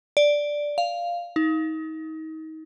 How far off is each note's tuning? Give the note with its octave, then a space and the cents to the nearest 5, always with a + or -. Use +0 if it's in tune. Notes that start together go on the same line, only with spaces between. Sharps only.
D5 +0
F5 -5
D#4 +30